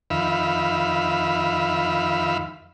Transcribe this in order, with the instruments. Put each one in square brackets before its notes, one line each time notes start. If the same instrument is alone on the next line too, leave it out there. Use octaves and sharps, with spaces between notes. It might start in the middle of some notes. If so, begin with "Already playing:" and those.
[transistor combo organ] F2 D#3 E5 F5 B5